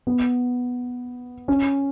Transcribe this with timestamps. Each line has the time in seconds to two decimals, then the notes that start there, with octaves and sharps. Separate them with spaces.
0.07 B3
1.48 C#4